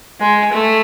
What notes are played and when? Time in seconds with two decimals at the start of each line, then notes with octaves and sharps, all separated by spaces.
0.20 G#3
0.52 A3